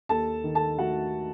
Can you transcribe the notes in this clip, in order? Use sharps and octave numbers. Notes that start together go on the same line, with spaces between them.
D#2 A4 A5
D#3
A4 A5
A3 F#4 F#5